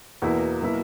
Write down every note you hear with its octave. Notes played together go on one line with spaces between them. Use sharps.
E2 B2 A#3 E4
B2 F#3 A#3 E4